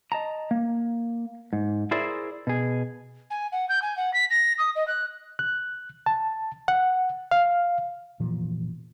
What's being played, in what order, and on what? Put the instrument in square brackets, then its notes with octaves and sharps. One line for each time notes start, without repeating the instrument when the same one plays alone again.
[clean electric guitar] D#5 A5 A#5
A#3
G#2
E4 G#4 A#4 C5 D5 E5
B2 G#4
[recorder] G#5
F#5
G6
G#5
F#5
B6
A#6
D#6
D#5
F#6
[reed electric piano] F#6
A5
F#5
F5
[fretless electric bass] F1 A#2 E3 F3